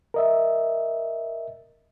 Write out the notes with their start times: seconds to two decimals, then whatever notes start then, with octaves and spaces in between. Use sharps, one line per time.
0.14 A#4 D#5 E5